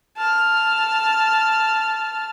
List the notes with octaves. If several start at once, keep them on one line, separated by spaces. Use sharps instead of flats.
A5 F6